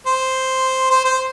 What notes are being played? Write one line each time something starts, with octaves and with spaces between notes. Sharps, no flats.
C5
C5
C5